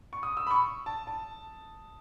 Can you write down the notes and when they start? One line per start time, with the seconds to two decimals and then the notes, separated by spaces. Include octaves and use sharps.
0.13 C#6
0.23 D#6
0.37 E6
0.47 B5
0.51 C#6
0.86 A5
1.07 A5